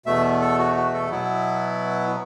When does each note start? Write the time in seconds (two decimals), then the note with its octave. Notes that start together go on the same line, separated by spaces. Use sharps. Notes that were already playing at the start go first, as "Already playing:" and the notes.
0.06 E2 B2 A3 E5
0.41 A4
0.59 F#4
0.76 F#4
0.93 A4
1.11 B2 F#3 B3 E4